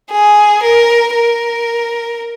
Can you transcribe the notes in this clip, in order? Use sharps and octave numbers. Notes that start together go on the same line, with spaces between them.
G#4
A#4
A#4